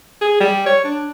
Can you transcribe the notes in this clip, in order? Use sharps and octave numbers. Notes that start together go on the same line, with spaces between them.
G#4
G3
C#5
D4